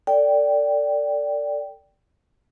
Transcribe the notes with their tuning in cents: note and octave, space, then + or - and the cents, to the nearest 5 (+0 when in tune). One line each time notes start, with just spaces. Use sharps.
A4 +35 D5 -10 G5 +0